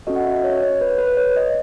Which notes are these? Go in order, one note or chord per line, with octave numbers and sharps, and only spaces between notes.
C#4 F#4 A4 D#5
F#5
E5
D#5
C#5
C#5
B4
B4
C#5
D#5